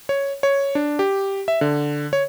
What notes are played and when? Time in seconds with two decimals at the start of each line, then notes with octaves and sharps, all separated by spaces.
0.09 C#5
0.43 C#5
0.75 D4
0.99 G4
1.48 E5
1.61 D3
2.13 C#5